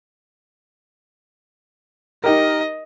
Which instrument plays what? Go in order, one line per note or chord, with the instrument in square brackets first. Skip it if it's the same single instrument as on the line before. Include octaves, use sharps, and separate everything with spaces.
[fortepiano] D#4 G4 A#4 [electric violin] D#5